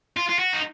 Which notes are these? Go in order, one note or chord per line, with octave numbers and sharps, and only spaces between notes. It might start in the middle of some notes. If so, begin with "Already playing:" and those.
F4
F4
F#4
D#4